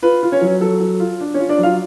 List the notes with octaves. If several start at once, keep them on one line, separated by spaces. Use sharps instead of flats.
F4 B4
F4
C#4 C#5
F#3
F#3 A4
F#3
F4
D4
C#4 C#5
F4
D4 D5
F#3
F4 F5